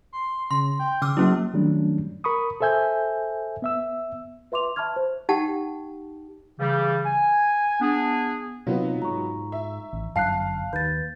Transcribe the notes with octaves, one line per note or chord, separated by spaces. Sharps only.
C6
C#3 C6
G5
C#3 D6 E6 F6
F#3 A#3 C#4 E4
D#3 F#3 G3 A3 C#4 D4
A#4 B5 C#6 D#6
A4 C5 E5 G#5 G6
B3 E5 E6
B4 E5 C6 D6 F7
E5 A5 B5 C#6 F6 G#6
C5
D#4 G4 F#5 G5 A5
C#3 E3 G3
G#5
B3 D4 G#4
C3 F#3 B3 D#4 F4
G#2 A#5 C#6
E5
A1
G1 F#2 F5 A5 F#6 C7
D#2 B4 G6 A6